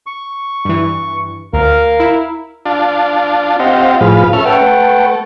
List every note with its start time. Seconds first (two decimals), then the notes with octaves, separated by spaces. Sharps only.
0.06 C#6
0.65 G2 E3
1.53 D2 A#4 F5
2.00 E4
2.66 D4 F4 A5
3.59 C4 F4 G4 D#5 F#5
4.01 A2 F3 G#4 B4 F5
4.33 C#4 A4 E5 F6
4.46 B4 F#5 G5
4.61 A3